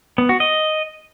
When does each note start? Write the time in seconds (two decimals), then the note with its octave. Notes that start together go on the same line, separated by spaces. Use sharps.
0.18 B3
0.29 F#4
0.40 D#5